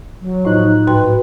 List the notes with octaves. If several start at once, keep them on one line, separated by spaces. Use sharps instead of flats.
F#3
A2 F3 D#4 F#6
G#2 F#4 B4 G5